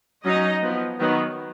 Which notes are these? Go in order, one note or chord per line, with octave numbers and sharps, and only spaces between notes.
F#3 C#4 D#4 D#5
F3 B3
D#3 F#3 B3